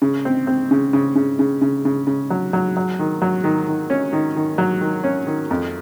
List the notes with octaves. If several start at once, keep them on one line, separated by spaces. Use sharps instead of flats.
C#3
C4
C4
C#3
C#3
C#3
C#3
C#3
C#3
C#3
F#3
F#3
F#3
D#3
F#3
D#3
D#3
C#4
D#3
D#3
F#3
D#3
C#4
D#3
F2